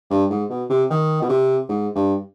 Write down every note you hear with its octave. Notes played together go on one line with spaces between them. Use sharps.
G2
G#2
B2
C3
D#3
B2
C3
G#2
G2